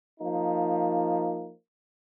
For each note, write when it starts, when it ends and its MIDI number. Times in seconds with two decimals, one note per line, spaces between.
0.20 1.50 53
0.20 1.50 58
0.20 1.50 63